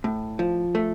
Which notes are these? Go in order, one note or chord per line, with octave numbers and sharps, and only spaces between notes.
A2
F3
A3